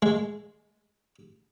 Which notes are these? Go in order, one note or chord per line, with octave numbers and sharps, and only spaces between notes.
G#3